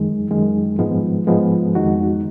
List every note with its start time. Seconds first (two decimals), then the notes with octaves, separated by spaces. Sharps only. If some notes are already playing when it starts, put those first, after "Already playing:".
Already playing: F#2 D#3 G#3
0.30 F#2 D#3 G#3
0.79 G#2 F3 G#3 B3
1.27 G#2 F3 G#3 B3
1.75 F2 D#3 G#3 D#4 F#4